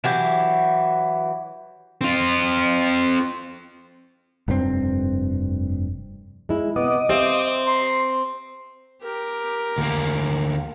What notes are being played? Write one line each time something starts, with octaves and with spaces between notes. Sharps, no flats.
E3 F#3 G4
C4 F4
F1 G2 A#2 C4
G#3 E4
C3 B3 D#5 D6 D#6
C4 G4 E5 F5
A#5 C6
G4 A#4
D2 A#3